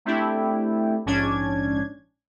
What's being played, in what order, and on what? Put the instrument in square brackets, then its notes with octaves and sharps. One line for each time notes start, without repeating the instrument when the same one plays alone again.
[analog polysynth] A3 C4 D4 E4 G4
A#1 G#2 C#4 D4 G#6